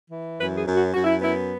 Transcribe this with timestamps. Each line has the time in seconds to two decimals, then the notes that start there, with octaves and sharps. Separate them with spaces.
0.11 E3
0.39 F#2 B4
0.57 G#4
0.67 F#2
0.75 F#4
0.94 F#2 F#4
1.04 E4
1.21 B3 E4